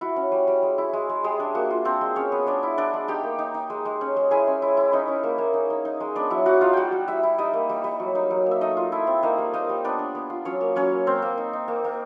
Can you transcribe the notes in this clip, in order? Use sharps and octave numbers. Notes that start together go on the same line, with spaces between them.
E4 F#4
C#4
G3
G3
G#3
E4
G#3
G#3
G3 G#3 G#4
D4
A#3 F#4
F4
C4 D4 C5
G#3
G#3 C#4 C#5
B3
G#3 D4 D5
E4
D4 E4 D5
G#3
D#4 G4 G5
A#3
D#4
D#4
G#3
G#3
C#4
G#3
E4 G#4 G#5
C#4
E4
E4
C#4 D#4 D#5
C#4
A#3
A#3
D#4
D#4
D#4
G#3
B3 D4 D5
F#3 E4 E5
F#3 F#4 F#5
D#4 F4 F5
G3 F#4 F#5 G5
G3
G3 E4 E5
E4
G3 D#4 D#5
A#3
G3
G3
F#3
D#4
F#3
A#3
E5
A3 D#4 D#5
F4
A3 E4 E5
C4
A#3 D#4 D#5
G3
A#3 D#4 D#5
G3
B3 D4 D5
D4
B3
F4
F#3 C#4 C#5
A#3
F#3 C#4 C#5
A#3
A#3 C4 C5
A#3
D#4
D#4
A#3
A#3